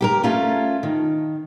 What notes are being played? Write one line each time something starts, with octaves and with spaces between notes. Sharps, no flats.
G4 A4 A#4
A3 C#4 F4 A4
D#3